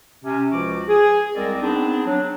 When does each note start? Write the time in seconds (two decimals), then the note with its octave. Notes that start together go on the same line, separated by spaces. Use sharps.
0.25 C3 C#4
0.52 C#2 F3 F#4 D6
0.89 G#4
1.36 C2 G#3 C4 A#4 D5 D#5
1.62 B3 C4 D4 D#4 G#4
2.07 F#3 D4